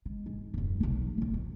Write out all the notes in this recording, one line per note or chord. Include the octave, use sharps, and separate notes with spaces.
G#3
G#2
D#1 F#2
B1 F#3
D2 E3
F2